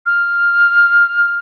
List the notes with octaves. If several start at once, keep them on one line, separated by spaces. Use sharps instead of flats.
F6